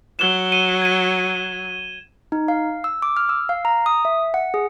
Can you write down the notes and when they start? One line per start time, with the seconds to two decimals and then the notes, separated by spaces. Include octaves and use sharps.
0.19 F#3 E7 G7
0.52 D#7
0.82 G#6 D#7
2.32 D#4
2.48 F5
2.84 E6
3.02 D6
3.17 F6
3.29 E6
3.49 F5
3.65 A#5
3.86 D#6
4.05 E5
4.34 F#5
4.54 G#4